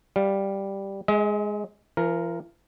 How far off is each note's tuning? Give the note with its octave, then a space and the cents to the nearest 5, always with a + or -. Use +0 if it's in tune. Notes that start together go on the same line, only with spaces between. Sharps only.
G3 +0 F5 +0
G#3 +0 D#5 +45
F3 -45 A#4 +0